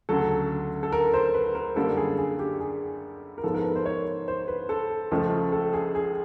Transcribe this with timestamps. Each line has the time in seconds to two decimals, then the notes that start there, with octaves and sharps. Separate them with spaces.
0.09 D2 C#3 F#3 A4
0.83 A4
0.92 A#4
1.14 C5
1.34 B4
1.55 A#4
1.76 F#2 D3 G3 A#3 A4
1.97 G#4
2.18 G#4
2.39 G4
2.61 G#4
3.38 A#4
3.44 G#2 F3 G#3 B3 A4
3.54 A#4
3.65 B4
3.76 C5
3.86 C#5
4.28 C5
4.48 B4
4.69 A4
5.11 C#2 C#3 F3 A3
5.52 A4
5.73 G#4
5.95 G#4